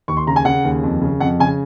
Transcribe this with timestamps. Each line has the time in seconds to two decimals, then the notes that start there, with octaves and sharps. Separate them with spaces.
0.08 D#2 C#6
0.17 C6
0.27 C#3 A#5
0.36 G#5
0.45 C#3 F#5
0.64 D#2
0.83 F2
1.01 C#3
1.20 F2 F#5
1.39 C#3 G#5